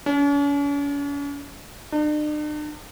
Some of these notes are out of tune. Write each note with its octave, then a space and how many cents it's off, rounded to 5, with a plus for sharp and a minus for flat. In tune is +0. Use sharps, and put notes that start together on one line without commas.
C#4 +45
D4 +45